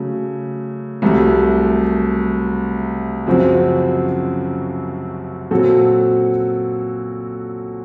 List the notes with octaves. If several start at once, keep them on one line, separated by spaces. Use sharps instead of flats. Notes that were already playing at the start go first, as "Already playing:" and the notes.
Already playing: C#3 F#3 A3
C2 C3 F#3 A3
F#2 C#3 F3 C4 F#4
A#2 F#3 C4 F#4 A4